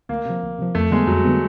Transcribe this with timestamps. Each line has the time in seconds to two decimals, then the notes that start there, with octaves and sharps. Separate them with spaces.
0.09 D2 A#3
0.25 C3 F3
0.42 D2
0.59 C3 F3
0.75 F2 A3
0.91 D3 G3 G#3 B3
1.07 F2 F#3
1.25 D3 G3 B3